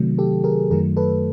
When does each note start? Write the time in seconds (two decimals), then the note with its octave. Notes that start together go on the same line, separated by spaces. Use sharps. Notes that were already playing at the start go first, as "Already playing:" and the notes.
Already playing: C3 D#3 F#3 A3
0.18 G4 A4
0.44 G#4 A#4
0.70 F#2 D#3 F#3 A3 G#4 A#4
0.97 A4 B4